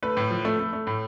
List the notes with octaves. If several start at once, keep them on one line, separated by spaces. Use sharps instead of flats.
A3 B4
A2
F3
A3
A3
A3
A2